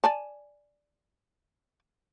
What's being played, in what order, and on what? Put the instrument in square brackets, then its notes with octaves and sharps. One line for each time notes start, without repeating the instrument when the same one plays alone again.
[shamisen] D5 G#5 A5